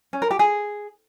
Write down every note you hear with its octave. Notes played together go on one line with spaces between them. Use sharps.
C#4
A#4
G4
G#4